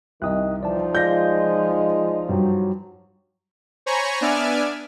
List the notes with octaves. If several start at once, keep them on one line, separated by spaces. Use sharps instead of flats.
C2 D#3 D#5 D#6 F#6
E3 F3 D#4 D5 A5
G#3 F4 D5 F5 G6 A#6
G2 F#3
C5 C#5 G#5 A#5 B5 C#6
B3 D4 D5 E5 G#5 F6